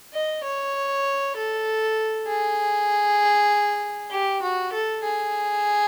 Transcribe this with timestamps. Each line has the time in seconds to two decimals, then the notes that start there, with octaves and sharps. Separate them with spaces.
0.13 D#5
0.44 C#5
1.36 A4
2.28 G#4
4.11 G4
4.42 F#4
4.73 A4
5.04 G#4